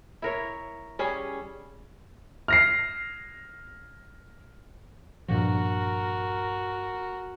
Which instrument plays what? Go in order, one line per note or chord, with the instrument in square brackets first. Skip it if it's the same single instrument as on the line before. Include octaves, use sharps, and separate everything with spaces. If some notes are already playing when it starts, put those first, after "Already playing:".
[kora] E4 A#4 C#5
G3 C#4 G#4
[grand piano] F6 A#6 C7
[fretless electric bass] G2 A#2 F3 [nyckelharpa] F#4 A#4